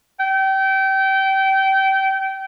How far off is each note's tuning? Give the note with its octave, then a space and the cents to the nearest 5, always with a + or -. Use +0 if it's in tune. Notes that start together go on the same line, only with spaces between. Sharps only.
G5 -25